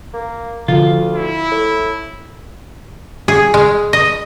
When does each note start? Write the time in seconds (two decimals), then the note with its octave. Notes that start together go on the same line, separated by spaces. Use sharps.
0.14 A#3
0.68 D2 D3 F3 F4
1.15 E4
1.51 A2
3.28 G#4
3.54 G#3
3.93 D#5